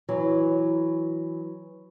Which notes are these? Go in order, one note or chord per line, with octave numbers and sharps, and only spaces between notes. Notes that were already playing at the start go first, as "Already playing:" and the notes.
E3 F#3